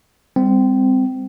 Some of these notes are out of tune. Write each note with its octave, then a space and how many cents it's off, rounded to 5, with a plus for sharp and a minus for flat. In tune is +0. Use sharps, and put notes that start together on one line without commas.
G3 +25 C4 -20